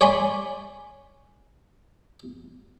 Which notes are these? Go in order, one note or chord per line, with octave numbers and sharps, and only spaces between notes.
C#5 D5 G#5 B5 C6